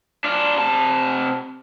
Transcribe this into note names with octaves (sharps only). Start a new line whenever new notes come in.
D4 F4
C3 A5